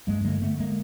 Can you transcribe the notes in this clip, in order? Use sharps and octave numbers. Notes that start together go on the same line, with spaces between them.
G2 G#3 A#3
D3 G#3 A#3
D3 A3 B3
G#3 A#3